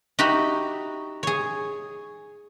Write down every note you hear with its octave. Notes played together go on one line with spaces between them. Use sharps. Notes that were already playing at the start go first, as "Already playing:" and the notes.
D#4 F#4 G4 E5 B5
G#4 C#5